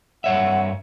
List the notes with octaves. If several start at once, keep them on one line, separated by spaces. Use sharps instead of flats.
G2 C#5 E5 F#5